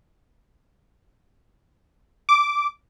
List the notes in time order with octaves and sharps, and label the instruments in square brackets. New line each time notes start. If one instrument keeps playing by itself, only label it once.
[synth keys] D6